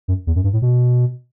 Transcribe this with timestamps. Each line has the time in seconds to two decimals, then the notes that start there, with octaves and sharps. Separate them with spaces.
0.08 F#2
0.27 E2
0.36 F#2
0.44 G2
0.53 A2
0.62 B2